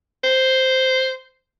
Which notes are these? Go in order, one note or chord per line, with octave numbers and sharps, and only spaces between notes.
C5